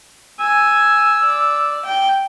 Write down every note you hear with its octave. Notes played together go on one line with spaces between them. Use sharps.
G#5 E6
D5
G5